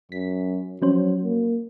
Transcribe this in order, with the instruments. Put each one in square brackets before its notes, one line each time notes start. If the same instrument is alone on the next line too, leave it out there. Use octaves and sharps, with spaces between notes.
[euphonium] F#2 [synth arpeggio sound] B6
[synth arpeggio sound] F3 C#4 C5 [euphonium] F#3
[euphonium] A#3